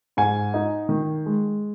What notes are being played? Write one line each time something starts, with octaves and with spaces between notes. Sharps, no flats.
G#2 G#5
D#4
D#3
G#3